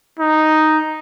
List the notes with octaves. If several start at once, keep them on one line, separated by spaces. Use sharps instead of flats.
D#4